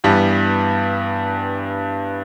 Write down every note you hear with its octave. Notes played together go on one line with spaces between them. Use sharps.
G2 E3 G3 B3